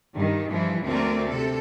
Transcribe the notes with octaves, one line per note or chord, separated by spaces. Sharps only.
G2 D#3
G2 E3 F3 E4
D2 A3 C4 A#4 D5
C3 A4